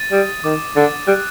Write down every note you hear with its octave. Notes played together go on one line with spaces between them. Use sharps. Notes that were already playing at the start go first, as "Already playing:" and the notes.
Already playing: A6 D#7
G3 D#6
D#3 D6
D3 A6
G3 F#6